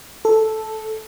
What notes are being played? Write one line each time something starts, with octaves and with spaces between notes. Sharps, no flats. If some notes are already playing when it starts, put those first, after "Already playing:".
A4